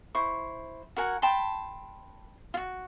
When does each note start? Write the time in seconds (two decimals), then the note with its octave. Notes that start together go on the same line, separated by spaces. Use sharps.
0.15 E4 C5 C#6
0.97 F#4 A#4 F#5 G#5
1.22 G5 A5 B5 C6
2.54 F4 F#4